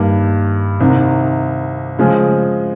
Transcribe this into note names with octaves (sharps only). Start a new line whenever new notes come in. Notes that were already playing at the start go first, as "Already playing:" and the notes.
Already playing: G2 D#3 G3 A#3
C2 C3 D#3
C#3 F3 G#3